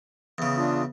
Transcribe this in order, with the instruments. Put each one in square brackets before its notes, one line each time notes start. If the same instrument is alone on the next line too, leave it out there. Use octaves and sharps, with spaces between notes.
[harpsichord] E2 C#3
[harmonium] D4 F4